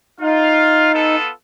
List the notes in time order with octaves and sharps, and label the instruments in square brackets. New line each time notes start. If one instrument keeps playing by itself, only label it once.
[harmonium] D#4 [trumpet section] F4 F5
[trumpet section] B3 F4 A4